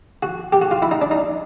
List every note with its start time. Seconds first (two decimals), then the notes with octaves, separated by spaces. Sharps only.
0.23 F#4
0.53 G4
0.62 F#4
0.71 F4
0.82 E4
0.91 D#4
1.02 D4
1.11 D#4